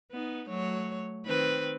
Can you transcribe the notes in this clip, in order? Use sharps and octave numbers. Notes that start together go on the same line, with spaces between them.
B3 D#4
F#3 A3 C#5
D#3 C4 B4